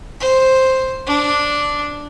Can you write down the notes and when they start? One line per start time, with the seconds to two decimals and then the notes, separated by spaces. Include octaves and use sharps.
0.20 C5
1.07 D4